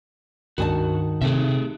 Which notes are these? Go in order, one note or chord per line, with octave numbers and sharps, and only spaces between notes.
C#2 G2 D#3 D4 F#4 G#5 A5
C3 A3 D#4 G#4 A4 E5